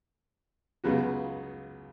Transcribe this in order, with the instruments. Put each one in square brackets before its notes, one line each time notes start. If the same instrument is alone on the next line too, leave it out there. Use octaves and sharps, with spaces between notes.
[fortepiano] C#2 C#3 F#3 B3 F#4